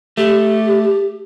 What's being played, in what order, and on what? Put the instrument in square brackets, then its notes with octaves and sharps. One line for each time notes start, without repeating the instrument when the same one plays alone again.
[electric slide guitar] A3 [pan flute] G4